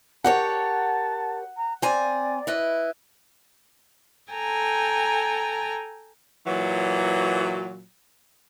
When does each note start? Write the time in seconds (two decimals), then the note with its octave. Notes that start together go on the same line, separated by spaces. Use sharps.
0.24 G4 A#4 C#5 F#5 A5
1.57 A#5
1.82 C4 D5 G#5 A#5
2.47 E4 B4 D#5
4.32 A4 G5 G#5 A#5
6.47 A#2 E3 F#3